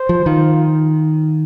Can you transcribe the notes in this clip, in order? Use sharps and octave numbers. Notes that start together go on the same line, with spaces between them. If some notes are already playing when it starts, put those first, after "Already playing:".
Already playing: C5
F3
D#3 F4